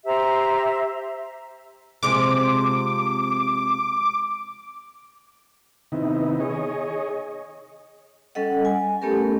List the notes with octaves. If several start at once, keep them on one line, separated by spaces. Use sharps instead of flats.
G4 C5 E5 A#5
C3 F3 G#3 D6
C3 D#3 B3 D#4 E4
G#4 C#5 D#5
G3 C#4 A4 D#5 F#5
G#5
A3 B3 C#4 G4 A4 A#4